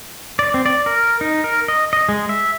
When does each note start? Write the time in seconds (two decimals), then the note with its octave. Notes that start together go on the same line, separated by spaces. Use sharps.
0.39 D5
0.54 C4
0.66 D5
0.86 A#4
1.21 D#4
1.44 A#4
1.68 D#5
1.93 D#5
2.09 G#3
2.29 E5